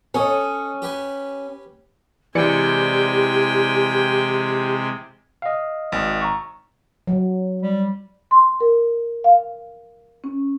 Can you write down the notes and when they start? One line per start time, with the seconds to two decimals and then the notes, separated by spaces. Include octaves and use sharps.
0.14 C#4 A4 D#5
0.82 G4 B4 G#5
2.35 C3 E3 G#3 G4 D5 G5 G#5 C#7
5.42 D#5 F5
5.92 G#1
6.21 A#5 C#6
7.07 F#3
7.63 G3
8.31 C6
8.61 A#4
9.24 F5
10.24 C#4